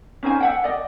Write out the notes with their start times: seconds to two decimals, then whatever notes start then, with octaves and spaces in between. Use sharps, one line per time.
0.23 C#4 D#4 C5 G#5
0.40 E5 F#5 G5
0.64 D5 D#5